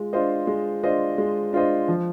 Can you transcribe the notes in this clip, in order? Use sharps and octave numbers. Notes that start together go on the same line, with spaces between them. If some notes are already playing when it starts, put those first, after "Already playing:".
Already playing: G#3 F4
D4 F4 C5 D#5
G#3
D4 F4 C5 D#5
G#3
D4 F4 C5 D#5
F3